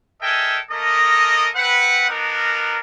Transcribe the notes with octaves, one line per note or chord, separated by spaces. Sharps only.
A4 A#4 D#5 E5 G5 G#5
A3 A#3 A4 A#4 D#5
C4 B4 F#5
B3 D4 D#4 A#4